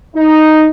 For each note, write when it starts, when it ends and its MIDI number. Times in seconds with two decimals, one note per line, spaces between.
0.16 0.68 63